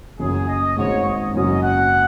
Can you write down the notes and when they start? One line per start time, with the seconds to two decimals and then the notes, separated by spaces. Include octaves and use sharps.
0.19 F#1 F#2 F#3 C#4 F#4 G#4
0.48 D#5
0.76 G#1 G#2 G#3 C#5
1.06 D#5
1.34 F#1 F#2 F#3 C#4 D#5
1.62 F#5